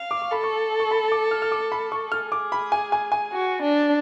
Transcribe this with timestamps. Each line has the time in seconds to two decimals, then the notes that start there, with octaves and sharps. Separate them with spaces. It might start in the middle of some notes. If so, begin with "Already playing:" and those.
Already playing: F5
0.11 D6
0.22 C#6
0.31 A4 B5
0.43 C#6
0.80 C#6
0.91 B5
1.12 D6
1.31 F6
1.42 F6
1.52 D6
1.72 B5
1.92 C#6
2.12 G#4 F6
2.32 D6
2.52 B5
2.72 G#5
2.92 G#5
3.12 G#5
3.32 F#4
3.62 D4